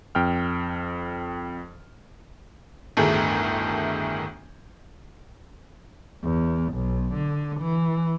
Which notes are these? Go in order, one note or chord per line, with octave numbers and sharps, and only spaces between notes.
F2 G5 F6
G1 D2 A2 D#3 A3 G#4
E2
B1
D3
E3